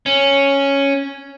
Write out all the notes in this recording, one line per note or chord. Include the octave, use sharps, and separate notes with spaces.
C#4